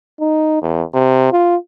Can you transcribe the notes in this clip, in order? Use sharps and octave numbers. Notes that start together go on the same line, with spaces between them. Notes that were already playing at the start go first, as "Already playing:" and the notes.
D#4
E2
C3
F4